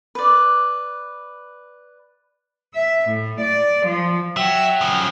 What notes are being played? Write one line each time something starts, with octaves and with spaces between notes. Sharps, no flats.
B4 D5
E5
A2
D5
F3
F#3 E5 G5
C#3 F3